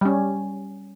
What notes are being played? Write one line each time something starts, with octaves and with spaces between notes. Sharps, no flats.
G3 C#4